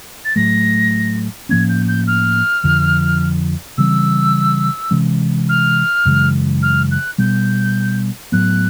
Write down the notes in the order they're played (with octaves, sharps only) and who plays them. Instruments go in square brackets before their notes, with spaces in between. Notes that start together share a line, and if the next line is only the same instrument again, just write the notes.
[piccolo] A6
[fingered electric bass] A2 F#3 A3 [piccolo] A#6
[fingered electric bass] A2 F3 A#3 C#4 [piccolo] G#6
[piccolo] G6
G6
F6
[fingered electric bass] F2 D3 F3
[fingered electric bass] C#3 E3 G3 C4 [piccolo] E6
[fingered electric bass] C3 E3 G#3 C#4
[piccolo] F6
[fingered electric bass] F#2 C#3 E3 G#3
[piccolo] F6
F#6
[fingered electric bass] B2 G3 B3 [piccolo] G6
[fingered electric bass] A2 F#3 B3 [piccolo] F#6